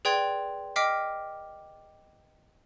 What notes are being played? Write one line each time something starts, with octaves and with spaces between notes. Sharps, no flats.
G#4 B4 D5 G5 C6 G#6
D#5 G5 D6 F6 B6 C7